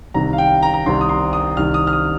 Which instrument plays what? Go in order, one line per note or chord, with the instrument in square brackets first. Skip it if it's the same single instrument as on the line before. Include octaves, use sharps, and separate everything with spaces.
[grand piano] C2 C3 D#3 A#5
F5
G5
A#5
A#5
C2 C3 D#3 C6
D#6
C6
D#6
C2 C3 D#3 F6
D#6
F6
D#6